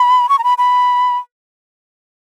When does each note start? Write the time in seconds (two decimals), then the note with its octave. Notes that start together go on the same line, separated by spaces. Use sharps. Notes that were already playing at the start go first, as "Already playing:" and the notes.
Already playing: B5
0.29 C#6
0.39 A#5
0.44 B5
0.58 B5